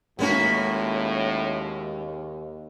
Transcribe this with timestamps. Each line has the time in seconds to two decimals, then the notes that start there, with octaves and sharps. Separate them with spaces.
0.19 D#2 A2 G#3 A#3 B3 C#4 D#4 F#4